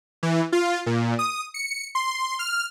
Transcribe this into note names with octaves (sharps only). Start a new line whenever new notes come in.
E3
F4
A#2
D#6
C#7
C6
F6